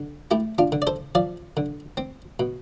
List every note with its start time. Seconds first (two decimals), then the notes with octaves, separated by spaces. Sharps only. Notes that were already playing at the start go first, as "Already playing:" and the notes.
Already playing: D3
0.31 A3 E4 G4
0.58 D4 F4
0.72 D3
0.82 D5
0.87 A4 C5
1.15 F3 D5 F5
1.57 D3
1.97 C4
2.40 B2